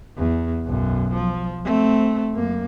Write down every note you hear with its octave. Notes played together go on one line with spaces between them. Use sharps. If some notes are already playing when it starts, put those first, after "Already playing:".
E2
B1 F#2
F3
A3 C4
F#2 A#3